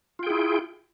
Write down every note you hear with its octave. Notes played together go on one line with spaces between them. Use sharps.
E4 F4 G#4 G5